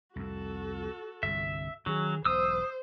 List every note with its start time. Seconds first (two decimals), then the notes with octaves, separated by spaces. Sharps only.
0.16 C2 F2 F#4 A4
1.23 G1 C2 G2 E5
1.86 D#3 F#3 C#4 G#4
2.25 E1 B1 C5 D#6 E6